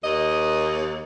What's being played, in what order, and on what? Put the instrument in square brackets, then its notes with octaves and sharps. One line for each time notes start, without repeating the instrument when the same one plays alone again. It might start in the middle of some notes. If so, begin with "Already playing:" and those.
[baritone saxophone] D#2 [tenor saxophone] D#5